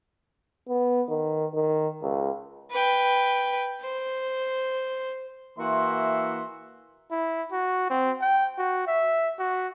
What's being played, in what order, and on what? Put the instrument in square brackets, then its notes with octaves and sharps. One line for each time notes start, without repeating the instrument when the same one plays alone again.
[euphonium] B3
D#3
D#3
C#2
[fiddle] B4 G5
C5
[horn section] E3 A#3 E4 F#4 E5 C6
[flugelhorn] E4
F#4
C4
G5
F#4
E5
F#4